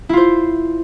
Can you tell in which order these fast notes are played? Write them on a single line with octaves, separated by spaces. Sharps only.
E4 F4 C5